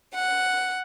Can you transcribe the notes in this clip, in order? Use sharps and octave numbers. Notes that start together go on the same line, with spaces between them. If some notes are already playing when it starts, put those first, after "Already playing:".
F#5